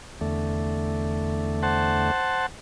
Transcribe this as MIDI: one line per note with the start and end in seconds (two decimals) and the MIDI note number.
0.21 2.11 40
0.21 2.11 50
0.21 2.11 57
1.63 2.46 72
1.63 2.46 78
1.63 2.46 81